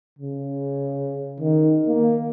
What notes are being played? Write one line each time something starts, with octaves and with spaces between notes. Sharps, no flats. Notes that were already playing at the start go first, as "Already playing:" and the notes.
C#3
D#3
A#3